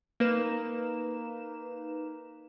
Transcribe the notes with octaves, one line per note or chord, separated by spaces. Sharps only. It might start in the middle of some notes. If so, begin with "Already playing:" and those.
A#3 D#4 B4 E7